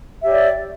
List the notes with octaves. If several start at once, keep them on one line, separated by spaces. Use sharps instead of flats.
G4 C#5 D5 E5